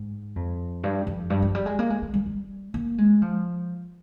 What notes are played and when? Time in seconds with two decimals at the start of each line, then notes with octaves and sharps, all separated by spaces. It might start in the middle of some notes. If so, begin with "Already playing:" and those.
Already playing: G#2
0.36 F2
0.83 G2
1.07 F2
1.30 G2
1.42 F3
1.55 G3
1.66 G#3
1.79 A#3
1.90 G#3
2.02 G#3
2.14 G3
2.26 G3
2.74 A#3
2.98 G#3
3.22 F3